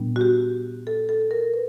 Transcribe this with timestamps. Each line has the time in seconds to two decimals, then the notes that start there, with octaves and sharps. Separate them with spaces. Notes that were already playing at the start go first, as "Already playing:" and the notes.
Already playing: A#2 G3 B3 D4
0.16 F#4
0.21 G4
0.87 A4
1.09 A4
1.31 A#4
1.54 B4